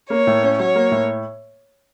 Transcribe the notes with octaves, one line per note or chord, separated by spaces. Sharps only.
A#3 C#5
A2
C#4
F#3 C#5
A#3
A2